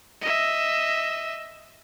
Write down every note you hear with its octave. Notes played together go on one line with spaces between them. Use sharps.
D#5 E5